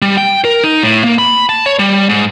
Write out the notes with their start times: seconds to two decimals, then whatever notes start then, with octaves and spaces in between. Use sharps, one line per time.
0.02 G3
0.17 G5
0.45 A#4
0.64 D#4
0.83 A2
1.04 A#3
1.18 B5
1.49 A5
1.66 C#5
1.79 G3
2.09 G#2